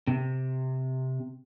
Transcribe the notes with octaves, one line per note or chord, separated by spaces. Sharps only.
C3